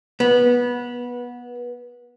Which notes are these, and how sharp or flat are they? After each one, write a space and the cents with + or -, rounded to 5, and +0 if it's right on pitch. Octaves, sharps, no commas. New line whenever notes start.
B3 -20